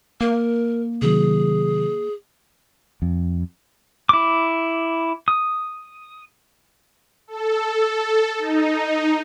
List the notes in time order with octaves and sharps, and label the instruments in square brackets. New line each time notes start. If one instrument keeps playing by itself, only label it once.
[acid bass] A#3 [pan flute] A#4
[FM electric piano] C3 D#3 F#3 [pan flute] G#4
[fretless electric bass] F2
[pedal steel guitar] E4 D6
D#6
[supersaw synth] A4
D#4